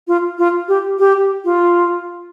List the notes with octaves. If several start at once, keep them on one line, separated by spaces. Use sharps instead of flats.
F4
F4
G4
G4
F4